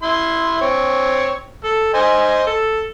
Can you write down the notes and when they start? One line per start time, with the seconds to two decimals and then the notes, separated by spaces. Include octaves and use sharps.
0.03 E4 C6
0.61 C4 C#5
1.64 A4
1.94 C5 D#5 G#5
2.47 A4